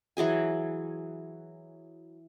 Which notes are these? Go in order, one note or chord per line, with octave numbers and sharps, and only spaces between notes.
E3 F#3 G#4 G#5